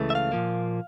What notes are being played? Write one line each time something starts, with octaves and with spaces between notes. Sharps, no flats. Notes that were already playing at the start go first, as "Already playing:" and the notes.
Already playing: C#2 C#3 E3 A3
E5
F5
A#2 F3 A#3